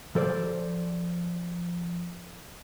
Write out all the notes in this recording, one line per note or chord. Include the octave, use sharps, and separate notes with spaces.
F3 A4 C5 D5